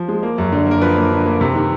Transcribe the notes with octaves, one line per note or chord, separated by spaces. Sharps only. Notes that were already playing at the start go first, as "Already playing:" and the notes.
Already playing: F3
G#3
A#3
F#2
D3
A#3 A#4
F3 B4
A#3
D3
A#3
C3
D#3